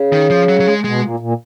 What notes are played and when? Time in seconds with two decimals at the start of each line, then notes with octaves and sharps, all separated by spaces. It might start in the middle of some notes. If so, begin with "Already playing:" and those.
Already playing: C#3
0.13 D#3
0.30 F3
0.49 F#3
0.60 F#3
0.67 G#3
0.84 B2 G#3
1.02 A#2
1.20 A#2